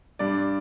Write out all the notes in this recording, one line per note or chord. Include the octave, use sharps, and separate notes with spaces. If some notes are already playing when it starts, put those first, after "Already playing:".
G2 D5